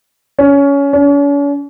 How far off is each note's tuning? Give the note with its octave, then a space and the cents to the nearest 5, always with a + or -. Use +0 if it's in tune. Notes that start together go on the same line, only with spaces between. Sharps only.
C#4 +20
C#4 +45